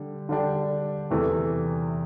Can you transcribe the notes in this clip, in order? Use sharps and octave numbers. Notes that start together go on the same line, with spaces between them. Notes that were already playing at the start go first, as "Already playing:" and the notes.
Already playing: D3 G3
D3 G3 D4 G4
E2 C3 E3 A3